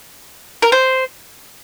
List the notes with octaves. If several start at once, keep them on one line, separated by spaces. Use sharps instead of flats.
A#4
C5